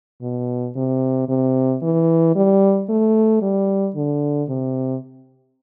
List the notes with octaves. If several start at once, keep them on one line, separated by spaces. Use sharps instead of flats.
B2
C3
C3
E3
G3
A3
G3
D3
C3